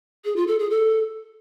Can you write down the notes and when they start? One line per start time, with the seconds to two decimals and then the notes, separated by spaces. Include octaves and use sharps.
0.25 G#4
0.36 F4
0.48 A4
0.59 G#4
0.70 A4